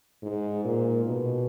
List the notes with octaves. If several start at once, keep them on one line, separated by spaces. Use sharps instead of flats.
G#2
A#2
B2